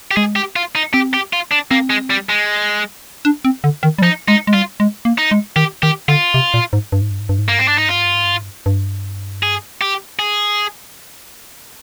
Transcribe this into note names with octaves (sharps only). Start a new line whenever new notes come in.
G4
G#3 G#4
G4
F4
D#4
C4 G4
G4
F4
D4
A#3 C4
G#3
G3
G#3
D4
C4
D3
D#3
G3
F3 D#4
G#3 D#4
G#3
G3 F4
G#3
A#3
D#4
G#3
D#3 G4
D#3 G4
D3 F4
C3
A#2
G#2
G2
G#2
G2
G#2
G2
G#2
G2 A#3
G#2 C4
G2 D4
G#2 D#4
G2 F4
G#2
G2
G#2
G2
G#2
G2
G2
G#4
G4
G#4